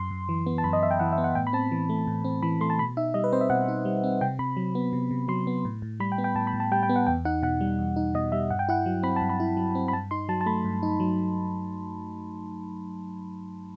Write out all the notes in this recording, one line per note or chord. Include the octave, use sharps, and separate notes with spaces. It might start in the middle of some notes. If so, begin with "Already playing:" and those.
Already playing: F#2 C6
F#2
E3
B3
A5
F#2 B5
D#5
F#2 E5
G5
E3 F#5
E5
B3
F#5
A2 G5
B5
C4 A5
E3
A3
A2
C4
E3 B5
A3 C6
A5
B2 B5
D#4 E5
G3 D#5
B4
C4 C5
E5
B2 F#5
D#4
G3
C4
C3 G5
C3 B5
F#3
B3
C3
C3
F#3 C6
B3
A2
A2
G3 B5
G5
B3
G5
A2 A5
B5
A2
A5
G3 G5
G5
B3
F#5
E2 G5
D#4 F#5
B2 F#5
G3
E2
D#4
B2 D#5
G3 E5
G2 F#5
G5
E4 F#5
F#3
C4 B5
G2 A5
B5
E4
F#3
C4
B5
G2 A5
D#4 C6
F#3 A5
A5
A3 B5
G2
D#4
F#3